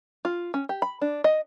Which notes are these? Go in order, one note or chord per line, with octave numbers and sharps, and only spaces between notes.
F4
C#4
G4
B5
D4
D#5